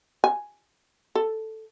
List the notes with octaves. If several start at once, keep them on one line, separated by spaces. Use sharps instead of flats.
G#5
A4